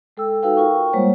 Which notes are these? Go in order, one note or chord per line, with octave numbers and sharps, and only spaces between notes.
G#3 A4 G5 E6
D#4 F#4 A4 B4 F5 G5
F4 A#4 G5 C#6
G3 G#3 A#3 C5 C#5 F#5